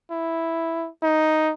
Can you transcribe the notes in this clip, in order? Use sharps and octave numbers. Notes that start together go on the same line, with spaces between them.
E4
D#4